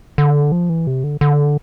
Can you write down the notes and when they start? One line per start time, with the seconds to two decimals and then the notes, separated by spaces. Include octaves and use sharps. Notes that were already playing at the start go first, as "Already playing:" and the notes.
0.18 D3
0.52 F3
0.69 E3
0.87 C3
1.04 D3
1.21 D3